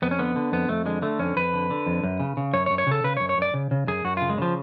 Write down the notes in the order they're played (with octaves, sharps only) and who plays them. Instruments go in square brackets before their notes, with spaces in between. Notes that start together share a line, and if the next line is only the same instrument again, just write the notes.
[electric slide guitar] F2 B3
C#4
D3 B3
D3
F2 B3
F2 A3
D3 G#3
D3 A3
F2 C#4
F2 B4
D3
D3
F2
F#2
C#3
C#3
F#2 C#5
C#5
F#2
C#5
C#3 A4
C#3 B4
C#5
F#2
C#5
F#2 D5
C#3
C#3
F#2 G#4
F#2 F#4
C#3 F4
G#3
C#3 F3